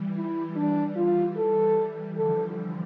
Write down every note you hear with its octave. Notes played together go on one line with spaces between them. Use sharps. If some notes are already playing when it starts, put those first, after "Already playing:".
Already playing: E3 G3
E4
D4
E3 G3 F4
A4
E3 G3
D3 F3 A4